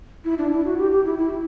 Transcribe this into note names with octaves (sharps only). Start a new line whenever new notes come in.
E4
D4
E4
F#4
G4
G4
E4
E4